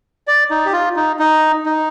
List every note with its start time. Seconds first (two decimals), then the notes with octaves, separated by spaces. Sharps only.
0.28 D5
0.51 D#4
0.66 G4
0.73 F4
0.96 D#4
1.19 D#4
1.66 D#4